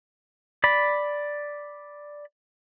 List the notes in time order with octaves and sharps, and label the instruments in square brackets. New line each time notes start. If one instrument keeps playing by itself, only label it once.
[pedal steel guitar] D5 B5